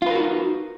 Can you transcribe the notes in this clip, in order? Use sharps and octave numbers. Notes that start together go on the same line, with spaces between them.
D#4 F4 F#4 A#4 B4